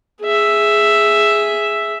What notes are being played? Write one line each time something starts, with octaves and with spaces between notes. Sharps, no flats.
G#4 E5